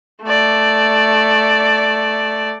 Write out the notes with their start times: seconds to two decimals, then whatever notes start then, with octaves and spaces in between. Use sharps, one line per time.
0.23 A3 D5